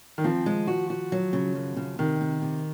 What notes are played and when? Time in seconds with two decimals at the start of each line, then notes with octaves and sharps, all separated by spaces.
0.18 D#3
0.24 F3 C4
0.46 G#3
0.67 F#4
0.90 F#4
1.12 F#3
1.33 C#3
1.55 F#2
1.76 C#3
1.99 C3 D#3
2.21 C3
2.42 C3